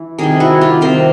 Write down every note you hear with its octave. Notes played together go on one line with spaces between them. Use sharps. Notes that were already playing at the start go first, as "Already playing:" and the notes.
Already playing: E3
C3 D#3 G3 G#4 A#4
E4 F#4
F4 G4
C3 D#3 G3 A#4 C5